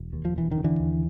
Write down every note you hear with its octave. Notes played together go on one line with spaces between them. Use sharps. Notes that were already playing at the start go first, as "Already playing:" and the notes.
Already playing: E1
D#2
F3
E1 E3
D#3
C#3
D3 E3
D#2